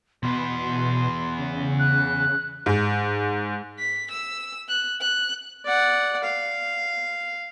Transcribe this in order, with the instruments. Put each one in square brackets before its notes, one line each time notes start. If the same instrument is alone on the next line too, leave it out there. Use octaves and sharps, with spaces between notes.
[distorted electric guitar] E2 B3 [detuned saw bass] B2 [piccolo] C6
[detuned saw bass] C#3
[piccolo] F#6
[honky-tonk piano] G#2
[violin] B6
E6
F#6
F#6
[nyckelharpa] D5 F#5
F5